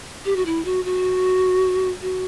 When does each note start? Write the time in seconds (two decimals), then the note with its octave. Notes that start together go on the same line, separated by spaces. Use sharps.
0.25 G4
0.36 F#4
0.45 E4
0.64 F#4
0.84 F#4
2.01 F#4